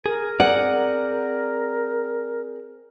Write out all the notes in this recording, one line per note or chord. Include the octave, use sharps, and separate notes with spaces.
G#4 A#4
C4 G#4 D5 F#5